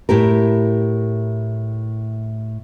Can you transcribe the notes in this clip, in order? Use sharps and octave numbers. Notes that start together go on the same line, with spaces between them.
A2 E4 G4 A#4